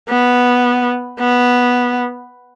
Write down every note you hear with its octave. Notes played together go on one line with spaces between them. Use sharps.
B3
B3